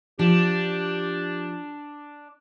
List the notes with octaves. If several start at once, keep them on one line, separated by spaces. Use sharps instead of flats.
F3 D4 G4